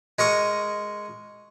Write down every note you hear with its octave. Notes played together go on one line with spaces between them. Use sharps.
G#3 A#4 C#6 D#6